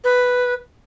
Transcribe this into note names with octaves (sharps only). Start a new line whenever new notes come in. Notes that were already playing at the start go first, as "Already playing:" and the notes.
B4